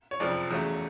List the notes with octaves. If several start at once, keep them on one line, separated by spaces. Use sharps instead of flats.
C#5
F#1 F2 C3 F3 D5
E2 C#3 F#3 A3